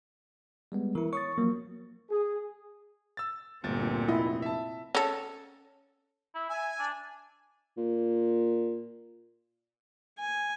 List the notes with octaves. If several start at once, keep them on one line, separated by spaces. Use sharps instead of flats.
G3 G#3 B3
E3 E4 A#4
C#5 C#6 D#6 A6
F3 F#3 A#3
G#4
E6 A6
G1 D2 A#2 C4 A6
F1 E4 D#5
E5 A5
C#4 A4
E4
E5 G#5
D4
A#2
G#5